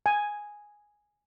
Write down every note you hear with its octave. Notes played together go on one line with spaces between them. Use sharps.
G#5